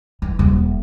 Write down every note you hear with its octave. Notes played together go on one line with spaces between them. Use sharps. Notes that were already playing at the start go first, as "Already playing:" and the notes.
E3
D#1